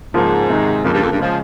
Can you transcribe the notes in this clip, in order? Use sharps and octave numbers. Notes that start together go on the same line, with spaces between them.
G#2 C#3 F3 A#3 F4
C3 D#3 G#3
F2 C#3 F3 A#3
G2
F2
G2
C#3 F3 G#3